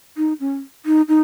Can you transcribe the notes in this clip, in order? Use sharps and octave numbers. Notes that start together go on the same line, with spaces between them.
D#4
C#4
D#4
D#4